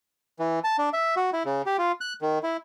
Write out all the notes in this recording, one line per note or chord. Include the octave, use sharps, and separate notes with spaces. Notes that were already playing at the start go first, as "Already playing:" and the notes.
E3
A5
D4
E5
F#4
E4
C#3
G4
F4
F#6
D#3
E4